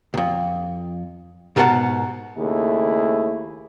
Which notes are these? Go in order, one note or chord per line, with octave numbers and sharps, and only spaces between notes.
C2 F2
G#2 B2 A#4 D#5 F#5 A5
D#2 C#3 A3 E4 G#4